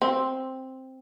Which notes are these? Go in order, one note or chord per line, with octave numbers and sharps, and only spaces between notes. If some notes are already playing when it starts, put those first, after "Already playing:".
C4